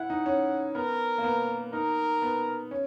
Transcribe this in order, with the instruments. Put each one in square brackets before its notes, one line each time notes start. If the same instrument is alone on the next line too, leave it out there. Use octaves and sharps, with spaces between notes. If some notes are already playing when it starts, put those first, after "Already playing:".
Already playing: [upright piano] E4 [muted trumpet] F#5
[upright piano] D#4
C#4
[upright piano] B3 [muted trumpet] A#4
[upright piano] A#3
B3
[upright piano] D#4 [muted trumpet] A#4
[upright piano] B3
C#4